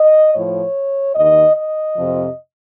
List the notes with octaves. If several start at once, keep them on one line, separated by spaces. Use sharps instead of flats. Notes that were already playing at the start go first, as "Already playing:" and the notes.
Already playing: D#5
A2 F3 C#5
D#2 D#3 D#5
D#5
F2 C3 F3